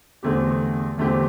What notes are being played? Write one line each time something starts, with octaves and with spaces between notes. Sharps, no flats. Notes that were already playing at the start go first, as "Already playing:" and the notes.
E2 D3 A3 C4 G4
E2 D3 A3 C4 G4